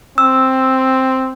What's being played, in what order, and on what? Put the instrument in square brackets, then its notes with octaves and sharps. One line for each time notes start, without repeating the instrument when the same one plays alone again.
[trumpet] C4 [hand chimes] E6